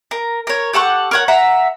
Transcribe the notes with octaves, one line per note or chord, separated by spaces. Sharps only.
A#4
A#4 C#5
G4 A4 F#5 C#6
A#4 C#5 F#5
E5 F#5 A#5